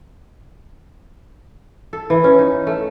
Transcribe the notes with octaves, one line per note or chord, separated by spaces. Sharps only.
A4
E3
C#4
D#4
A3